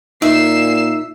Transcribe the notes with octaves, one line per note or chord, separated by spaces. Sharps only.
A#2 D#4 E5 C7 E7